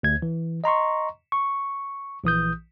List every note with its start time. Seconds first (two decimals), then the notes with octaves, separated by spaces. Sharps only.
0.03 D2 G#6
0.22 E3
0.64 D#5 A#5 C6 C#6
1.32 C#6
2.24 A#1 E3 D#6 G6